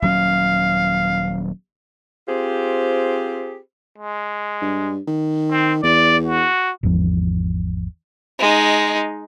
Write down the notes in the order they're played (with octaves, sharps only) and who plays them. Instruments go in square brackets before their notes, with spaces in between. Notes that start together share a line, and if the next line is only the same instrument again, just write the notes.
[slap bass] D#1 F#3 C#4 [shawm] F5
[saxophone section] C4 F4 G4 G#4 C5
[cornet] G#3
[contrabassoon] G2
D#3
[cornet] C4
[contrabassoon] E2 [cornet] D5
[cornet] F#4
[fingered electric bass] G#1 E2 F3
[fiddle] G#3 D#4